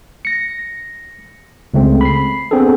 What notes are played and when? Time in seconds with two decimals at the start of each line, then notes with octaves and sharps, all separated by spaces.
0.25 A#6 C#7
1.74 C#2 C#3 A3 C4
2.01 B5 C7
2.51 B3 C4 D4 G#4 A4